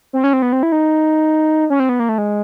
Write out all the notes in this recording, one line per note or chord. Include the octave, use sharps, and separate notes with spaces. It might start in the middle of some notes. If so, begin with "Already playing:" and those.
C4
C#4
C4
B3
C4
E4
D#4
C#4
C4
B3
A#3
A3
G#3